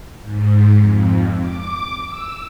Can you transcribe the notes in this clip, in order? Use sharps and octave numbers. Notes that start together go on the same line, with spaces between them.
G#2
F2
D6
E6